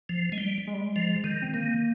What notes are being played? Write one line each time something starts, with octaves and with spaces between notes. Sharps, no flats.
F3
G#3
G3
G#3
G3
G#3
F3
D#3
C4
D#3 A#3